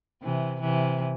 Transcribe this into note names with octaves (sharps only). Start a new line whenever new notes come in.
C3 E3
C3 E3